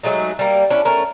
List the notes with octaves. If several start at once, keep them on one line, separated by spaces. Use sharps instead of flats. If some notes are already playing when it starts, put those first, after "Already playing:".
F#3 G#3 A3 D#4
G3 A#3
C#4 D4 E4
A3 C#4 A#4